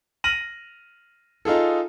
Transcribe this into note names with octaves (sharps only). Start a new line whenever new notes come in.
F6 A#6 D#7 F#7
D#4 F4 G#4 A4